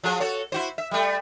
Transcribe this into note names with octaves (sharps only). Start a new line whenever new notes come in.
F3 F#3 G#4
F#4 A4 C#5
E4 F#4 C5
E5
G3 A3